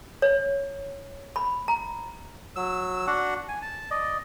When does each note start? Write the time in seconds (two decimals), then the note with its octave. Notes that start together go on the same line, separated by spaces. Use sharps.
0.22 C#5
1.36 B5
1.68 A#5
2.56 F#3 E6
3.07 D4 F#4 F#5
3.49 G#5
3.62 A5
3.91 D5 D#5